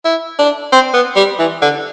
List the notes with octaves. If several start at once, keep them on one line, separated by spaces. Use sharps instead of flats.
E4
D4
C4
B3
G3
E3
D3